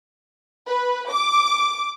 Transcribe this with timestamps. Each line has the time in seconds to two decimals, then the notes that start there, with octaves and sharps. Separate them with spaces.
0.68 B4
1.10 D6